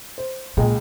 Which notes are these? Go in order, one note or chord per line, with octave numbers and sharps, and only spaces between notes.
C5
C#2 A#2 G#3 G5